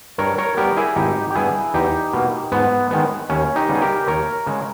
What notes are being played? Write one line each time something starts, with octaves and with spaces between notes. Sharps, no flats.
G2 A#4 C#5
A#4 C#5
G3 B3 G4 A#4
E4 G#4
G#1 D#4 G4
G4
G2 G3 B3 E4 G#4
E2 D#4 G4
B2 A#3
G#2 B3
D#3 G#3 B3
D#2 C#4
D#4 G4
C#3 G3 B3
G#4
G4 A#4
D#2 A#4 C#5
C#3 G#3